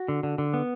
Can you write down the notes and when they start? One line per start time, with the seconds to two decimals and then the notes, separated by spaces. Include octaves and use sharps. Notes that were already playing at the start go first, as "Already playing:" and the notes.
Already playing: F#4
0.08 D3
0.23 D3
0.38 D3
0.54 B3